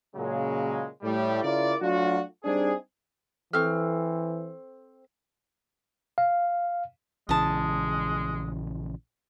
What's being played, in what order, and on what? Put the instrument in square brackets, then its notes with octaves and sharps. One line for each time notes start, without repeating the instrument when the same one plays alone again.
[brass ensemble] A#2 C#3 F#3 G#3
A2 G3
C#3 E4 F4 A#4 D5
F#3 A3 D4 F4 F#4
G3 C4 D4 D#4 G#4
[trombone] E3 [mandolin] C4 F6 [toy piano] A4 C#6
[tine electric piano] F5
[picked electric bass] A#1 C#3 E3 [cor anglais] G#3 [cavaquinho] A5 D#6